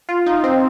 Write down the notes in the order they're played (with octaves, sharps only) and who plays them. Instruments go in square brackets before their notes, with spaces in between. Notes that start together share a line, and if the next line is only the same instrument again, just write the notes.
[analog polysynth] F4
D#4
C4